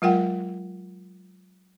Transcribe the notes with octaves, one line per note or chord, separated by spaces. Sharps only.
F#3 G#3 F4 A#4 F#5 G5